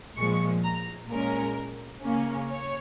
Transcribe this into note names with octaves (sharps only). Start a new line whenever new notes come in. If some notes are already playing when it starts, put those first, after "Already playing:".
A#2 F3 G#3 C#6
A#5
A#2 G#3 C#4 A#4
C#3 A#3 C#4
C#5